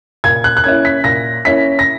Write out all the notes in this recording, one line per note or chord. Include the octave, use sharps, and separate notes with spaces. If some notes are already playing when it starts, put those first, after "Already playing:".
A#2 G#6
F#6
F#6
A#3 C#4 E4 G#6
B6
A#2 A#6
A#3 C#4 E4 B6
A#6